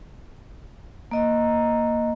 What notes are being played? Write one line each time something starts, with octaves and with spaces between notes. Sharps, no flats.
A#3 D#5 A#5